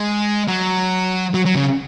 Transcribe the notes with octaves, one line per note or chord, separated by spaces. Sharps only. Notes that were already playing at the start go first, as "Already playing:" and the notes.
Already playing: G#3
F#3
F#3
F#3
C#3